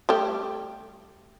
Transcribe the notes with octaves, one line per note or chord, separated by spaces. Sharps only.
G3 A3 G4